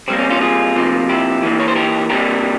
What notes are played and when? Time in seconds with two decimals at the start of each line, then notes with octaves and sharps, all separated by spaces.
0.08 C3 G3 A#3 C4
0.19 C#4
0.30 C#4 F4
0.41 F4 G#4
0.76 C3 F3 A#3
1.09 E4 G4
1.43 E3 A#3
1.60 C#5
1.68 C5
1.75 G4 A#4
2.10 C3 G3 A#3 G4 A#4